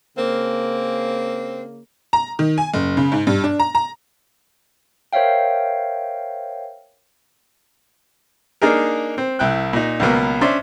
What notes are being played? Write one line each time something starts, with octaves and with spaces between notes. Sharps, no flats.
C#3 A#3 C4
A#5
D#3
G#5
F#1
C#3
G#2
G2
D4
A#5
A#5
A#4 C5 C#5 E5 F5 G5
A#3 D4 D#4 G#4 A#4
C4
C2 E4 G5 F#6
A#2 D#4
C#2 B2 F#3 A#3 B3
C#4 D4 C5 D5 E5 C6